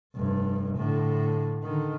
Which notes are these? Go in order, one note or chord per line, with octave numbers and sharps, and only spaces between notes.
F1 G2
A2 D3
D3 D#3